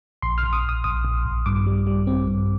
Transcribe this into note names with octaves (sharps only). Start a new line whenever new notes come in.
A#1 C6
F6
A#1
D#6
A#1
D#6
A#1 D#6
A#1
A#1
G2 D6
G3
G3
C4
G2